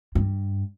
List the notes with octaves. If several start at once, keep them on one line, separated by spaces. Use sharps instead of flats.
G2